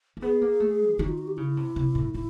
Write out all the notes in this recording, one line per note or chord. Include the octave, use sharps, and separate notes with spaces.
A#3
B3 G#4
A#3
A3
D3
D#3 F#4
F4
F#4
G4
C#3 E4
C3
C3
A2
A2 E4